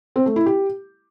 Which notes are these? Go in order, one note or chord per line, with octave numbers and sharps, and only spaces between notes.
C4
A3
E4
G4